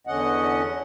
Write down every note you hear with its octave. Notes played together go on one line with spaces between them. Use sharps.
E2 D3 C#4 D#5 F#5